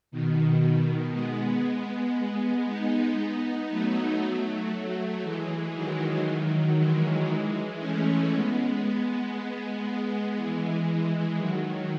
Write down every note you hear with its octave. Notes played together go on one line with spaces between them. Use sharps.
B2 D#3
G#3 B3
G#3 B3
B3 D#4
F#3 A3
F#3 A3
E3 G#3
D#3 F#3
E3 G#3
E3 G#3
A3 C#4
G#3 B3
E3 G#3
D#3 F#3